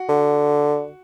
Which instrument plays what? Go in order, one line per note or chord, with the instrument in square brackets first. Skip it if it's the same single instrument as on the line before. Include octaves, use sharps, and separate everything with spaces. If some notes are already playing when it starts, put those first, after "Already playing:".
Already playing: [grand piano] F#4
[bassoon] D3